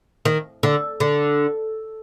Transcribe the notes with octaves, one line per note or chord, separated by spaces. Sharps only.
D#3
D3
D3